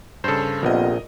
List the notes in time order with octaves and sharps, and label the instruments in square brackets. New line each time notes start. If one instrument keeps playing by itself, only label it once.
[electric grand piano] G2 C#3 [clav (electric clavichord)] A4 C5
[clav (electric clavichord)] A#1 [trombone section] F2 C3 B3 [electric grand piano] A#4 D#5